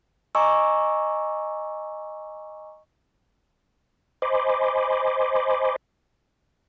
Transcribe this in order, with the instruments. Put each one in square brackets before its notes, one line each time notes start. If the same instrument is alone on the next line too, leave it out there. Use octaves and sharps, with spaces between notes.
[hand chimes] D#5 G#5 A#5 C#6 D6 E6
[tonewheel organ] C5 D#5 G#5 B5 C6 D6